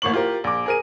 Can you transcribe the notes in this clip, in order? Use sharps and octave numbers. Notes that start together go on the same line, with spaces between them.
A1 A#3 C#6 F#7
F4 G4 A#4
A#1 D6
G#4 A#4 D#7